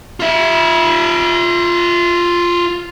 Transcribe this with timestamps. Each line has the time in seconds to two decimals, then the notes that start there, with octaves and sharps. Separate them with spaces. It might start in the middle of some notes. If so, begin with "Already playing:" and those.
0.20 F4 E5